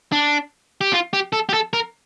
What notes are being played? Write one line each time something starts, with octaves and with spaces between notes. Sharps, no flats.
D4
G4
F4
G4
A4
G4
A4
A#4